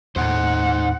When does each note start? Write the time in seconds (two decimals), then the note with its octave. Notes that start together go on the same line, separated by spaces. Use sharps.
0.16 D#2 A2 D#4 C5 F#5